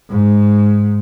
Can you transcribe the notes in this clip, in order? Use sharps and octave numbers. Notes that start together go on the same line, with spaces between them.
G#2